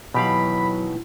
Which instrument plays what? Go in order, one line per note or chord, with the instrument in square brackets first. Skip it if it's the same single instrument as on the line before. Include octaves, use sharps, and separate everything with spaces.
[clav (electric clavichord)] B2 G4 F5 [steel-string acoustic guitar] D#3 E3 [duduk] F#3 [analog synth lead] B5